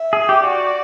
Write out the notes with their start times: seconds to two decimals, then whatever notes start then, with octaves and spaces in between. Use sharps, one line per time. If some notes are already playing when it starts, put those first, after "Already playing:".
Already playing: E5
0.13 G#4
0.29 G4
0.43 F#4 D5